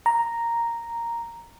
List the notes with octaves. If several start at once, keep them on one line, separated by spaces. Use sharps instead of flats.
A#5